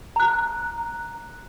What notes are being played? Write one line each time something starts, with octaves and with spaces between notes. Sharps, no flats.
A#5 F#6